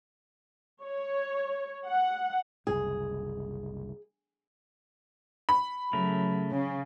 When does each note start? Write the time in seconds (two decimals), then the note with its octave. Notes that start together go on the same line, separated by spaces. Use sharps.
0.84 C#5
1.87 F#5
2.67 F#1 C2 G#4
5.49 B5
5.93 C#3 F#3 A3 A#4
6.52 C#3